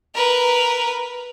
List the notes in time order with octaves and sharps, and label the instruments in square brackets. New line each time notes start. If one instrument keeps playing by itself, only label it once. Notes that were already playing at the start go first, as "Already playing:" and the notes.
[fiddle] A#4 B4